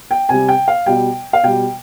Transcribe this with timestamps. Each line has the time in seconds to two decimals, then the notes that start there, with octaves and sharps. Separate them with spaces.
0.11 G5
0.29 C3 G3 G#5
0.49 G5
0.68 F5
0.86 B2 G3 G5
1.33 F5
1.43 B2 G3 G5